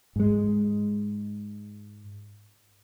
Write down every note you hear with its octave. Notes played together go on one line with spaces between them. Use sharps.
G#2 G#3